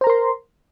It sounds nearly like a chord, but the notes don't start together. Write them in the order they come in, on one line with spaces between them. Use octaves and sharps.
C5 A#5 A#4 C6